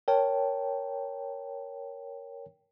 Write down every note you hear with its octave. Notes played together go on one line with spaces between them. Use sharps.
A#4 C#5 G5 A5